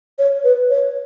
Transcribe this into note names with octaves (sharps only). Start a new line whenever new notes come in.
C#5
B4
C#5